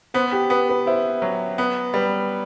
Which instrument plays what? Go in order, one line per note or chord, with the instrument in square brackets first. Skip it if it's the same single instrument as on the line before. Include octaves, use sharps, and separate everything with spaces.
[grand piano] B3 [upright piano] C5
[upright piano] G4
[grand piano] B3 [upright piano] B4
[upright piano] B4
[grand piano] E4 [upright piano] C5
[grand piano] F#3
[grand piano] B3 [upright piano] B4
[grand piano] G3 [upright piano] B4